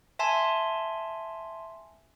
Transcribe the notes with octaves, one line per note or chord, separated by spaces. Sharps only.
E5 G#5 A5 C6